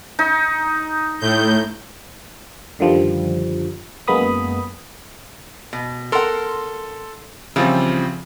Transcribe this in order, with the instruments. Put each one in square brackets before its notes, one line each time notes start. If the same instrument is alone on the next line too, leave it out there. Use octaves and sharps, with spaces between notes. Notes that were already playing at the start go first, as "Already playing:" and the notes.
[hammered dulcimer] D#4
[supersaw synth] A2 G6
[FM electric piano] F#2 D3 D#3 F3 G3
F#2 G#3 A#3 B3 B5 D#6
[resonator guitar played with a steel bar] B2
[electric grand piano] A4 C6 [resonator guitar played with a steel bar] A#4 F#5
[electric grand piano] C#3 F3 C4 [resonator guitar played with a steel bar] E3 G3 F4